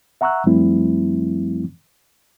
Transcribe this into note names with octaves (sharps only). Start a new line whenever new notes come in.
E5 F#5 A#5 C#6 E6 F#6
F#2 F3 G3 A3 C4 E4